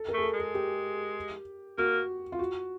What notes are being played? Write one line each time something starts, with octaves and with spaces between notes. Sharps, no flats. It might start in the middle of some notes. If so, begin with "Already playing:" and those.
Already playing: A4
A#4
A3 G#4
A4
G#3
G#4
G4
A#3 F#4
F4
F#4